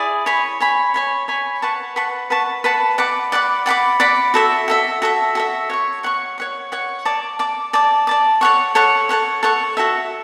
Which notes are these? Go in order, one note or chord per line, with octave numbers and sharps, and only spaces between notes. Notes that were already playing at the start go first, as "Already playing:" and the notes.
Already playing: E4 G#4 D5
C#5 G#5 B5
C#5 G#5 B5
C#5 G#5 B5
C#5 G#5 B5
B4 F#5 A5 C#6
B4 F#5 A5 C#6
B4 F#5 A5 C#6
B4 F#5 A5 C#6
D5 F#5 B5 D6
D5 F#5 B5 D6
D5 F#5 B5 D6
D5 F#5 B5 D6
F#4 A4 E5
F#4 A4 E5
F#4 A4 E5
F#4 A4 E5
C#5 F#5 C#6
C#5 F#5 C#6
C#5 F#5 C#6
C#5 F#5 C#6
D5 A5 D6
D5 A5 D6
D5 A5 D6
D5 A5 D6
A4 C#5 F#5 C#6
A4 C#5 F#5 C#6
A4 C#5 F#5 C#6
A4 C#5 F#5 C#6
F#4 A4 E5